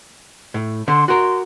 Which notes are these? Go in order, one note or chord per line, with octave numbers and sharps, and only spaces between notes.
A2
D3 C6
F#4 A#4 C6